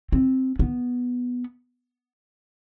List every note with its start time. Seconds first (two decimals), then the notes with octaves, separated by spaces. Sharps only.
0.12 C4
0.59 B3